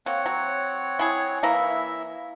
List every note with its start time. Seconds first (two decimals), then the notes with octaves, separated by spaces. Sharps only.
0.06 A#3 C4 C#5 F#5
0.26 F#3
0.99 E4 G#4
1.43 E3 A#3 E4 E5 A#5